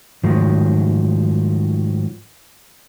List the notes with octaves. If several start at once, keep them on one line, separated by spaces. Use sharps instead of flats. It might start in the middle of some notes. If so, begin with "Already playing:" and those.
G#2 D#3 F3 F#3 A3